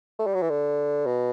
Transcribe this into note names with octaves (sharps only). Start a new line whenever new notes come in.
A3
G3
F#3
E3
D3
B2